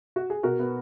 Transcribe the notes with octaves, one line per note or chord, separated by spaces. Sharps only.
F#4
G#4
B2 F#4 A#4
B3